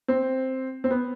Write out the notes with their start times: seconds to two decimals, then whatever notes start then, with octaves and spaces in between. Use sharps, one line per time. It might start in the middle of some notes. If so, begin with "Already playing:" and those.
0.08 C4
0.84 C4
0.91 B3